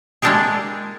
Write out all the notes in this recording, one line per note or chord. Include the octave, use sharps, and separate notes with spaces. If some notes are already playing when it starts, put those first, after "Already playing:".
G#3 A#3 D4 E4 G4 G#4